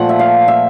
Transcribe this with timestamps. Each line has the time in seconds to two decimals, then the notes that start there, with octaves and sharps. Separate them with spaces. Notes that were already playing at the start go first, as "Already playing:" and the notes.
Already playing: A#2 F3 A3 F#5
0.09 E5
0.19 F5
0.48 E5